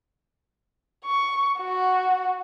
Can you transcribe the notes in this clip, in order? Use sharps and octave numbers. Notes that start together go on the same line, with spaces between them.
C#6
F#4